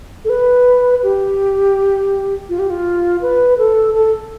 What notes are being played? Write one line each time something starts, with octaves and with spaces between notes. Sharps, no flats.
A4
B4
G4
F4
G4
F4
B4
A4
A4